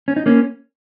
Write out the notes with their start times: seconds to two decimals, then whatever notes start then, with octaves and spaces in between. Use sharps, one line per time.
0.08 C#4
0.16 D#4
0.26 A#3 C#4